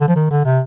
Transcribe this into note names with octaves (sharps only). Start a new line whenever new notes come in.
D3
F3
D#3
D3
C3